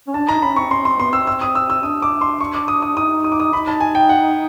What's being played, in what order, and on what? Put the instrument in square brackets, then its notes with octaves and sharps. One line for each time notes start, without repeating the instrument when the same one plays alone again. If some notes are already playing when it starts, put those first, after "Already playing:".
[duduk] C#4
[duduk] D4 [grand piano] A5
[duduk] D#4 [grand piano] A#5
[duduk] C#4 [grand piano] B5
[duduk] C4 [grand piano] C#6
[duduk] C#4 [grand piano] C6
[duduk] C4 [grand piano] C6
[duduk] B3 [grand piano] C6
[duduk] C4 [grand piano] E6
[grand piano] E6
D#6
E6
E6
[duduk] D4 [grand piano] D#6
[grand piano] D6
C6
C#6
D6
D#6
D#6
[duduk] D#4 [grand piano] D#6
[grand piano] D#6
D6
D#6
[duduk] D#4 [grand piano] B5
[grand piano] A5
G#5
G5
F#5